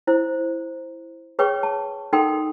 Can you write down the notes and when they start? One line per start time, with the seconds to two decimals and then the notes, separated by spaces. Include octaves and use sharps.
0.07 E4 C5
1.39 G#4 B4 C#5 G5 C#6
1.63 A5
2.13 D#4 A4 A#4 F#5 G5 C6